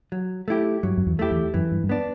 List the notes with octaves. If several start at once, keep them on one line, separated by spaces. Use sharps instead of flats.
F#3
A3 E4 G4
G2 F#3
F#2
E2
A3 E4 G4
E2
F#2 E3
G2
G2
B3 D4